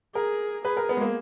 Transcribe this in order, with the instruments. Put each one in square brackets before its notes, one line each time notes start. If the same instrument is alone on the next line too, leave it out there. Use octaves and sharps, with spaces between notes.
[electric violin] G#4 [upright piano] A#4
[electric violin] G#4 [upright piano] B4
[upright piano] A#4
B3
G#3
A#3